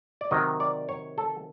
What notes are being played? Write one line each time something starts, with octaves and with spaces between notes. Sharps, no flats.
D5
C3 D#3 F#3 D#5
D5
C#5
A4